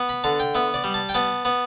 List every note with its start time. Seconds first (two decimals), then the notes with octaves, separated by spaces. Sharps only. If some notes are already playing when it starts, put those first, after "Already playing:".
Already playing: B3
0.09 B5
0.24 D3 A5
0.39 G5
0.54 B3 E5
0.74 D5
0.84 G3
0.94 A5
1.09 G5
1.14 B3 A5
1.45 B3